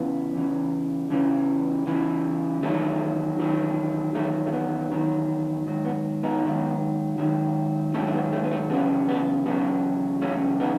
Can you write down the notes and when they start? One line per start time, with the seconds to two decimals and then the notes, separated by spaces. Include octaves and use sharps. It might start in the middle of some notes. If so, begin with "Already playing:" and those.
Already playing: E2 C#3 E3 B3
0.35 E2 C#3 E3
1.10 E2 C#3 E3
1.87 E2 C#3 E3
2.63 E2 D#3 F#3 A3
3.39 E2 D#3 F#3
4.15 E2 D#3 F#3 A3
4.47 A3
4.52 B3
4.91 E2 D#3 F#3
5.66 G#2 D#3 F#3
5.85 B3
6.23 B3 D#4
6.43 G#2 D#3 F#3
7.18 G#2 D#3 F#3
7.94 G#2 D#3 F#3 A3 C#4
8.07 A3
8.13 B3
8.33 A3
8.44 B3
8.51 A3
8.70 E2 C#3 F#3 B3
9.09 B3
9.46 E2 C#3 F#3 B3
10.22 E2 C#3 F#3 A3 C#4
10.60 B3 D#4